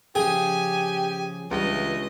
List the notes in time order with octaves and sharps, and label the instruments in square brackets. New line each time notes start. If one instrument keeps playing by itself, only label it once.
[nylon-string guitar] C#3 F3 [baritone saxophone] G4 [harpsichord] G#4 [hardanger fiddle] G#5
[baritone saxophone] C#2 [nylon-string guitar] E3 G3 D4 [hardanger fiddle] D#5